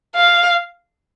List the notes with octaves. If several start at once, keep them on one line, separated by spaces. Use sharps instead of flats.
F5